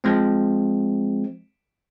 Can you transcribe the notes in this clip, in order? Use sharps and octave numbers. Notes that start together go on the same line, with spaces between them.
F3 G#3 C4